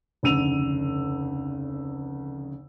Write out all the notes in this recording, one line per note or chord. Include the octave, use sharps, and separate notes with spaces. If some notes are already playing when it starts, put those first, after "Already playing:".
F1 D2 C#3 E6 D#7 F7